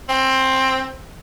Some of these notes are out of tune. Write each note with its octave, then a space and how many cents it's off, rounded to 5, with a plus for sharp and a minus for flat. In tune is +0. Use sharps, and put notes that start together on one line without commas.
C4 +15